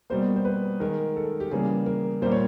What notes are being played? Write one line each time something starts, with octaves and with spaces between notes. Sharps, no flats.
B2 G3 A#3 C5
C5
B4
D#3 G#3 A#4
A4
G4
C#3 E3 G3 A#3 G#4
A#4
A#2 G3 A#3 C5
C#5